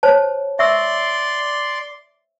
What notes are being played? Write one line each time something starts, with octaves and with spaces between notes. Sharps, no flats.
C5 C#5 A5
D5 E5 C6 C#6 E6